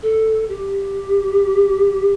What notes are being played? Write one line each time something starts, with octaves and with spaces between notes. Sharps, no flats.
A4
G4